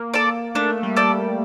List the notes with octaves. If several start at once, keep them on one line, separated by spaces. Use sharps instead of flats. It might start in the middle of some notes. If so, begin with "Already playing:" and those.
Already playing: A#3
A4 D5
A3 D4
G3
A4 D5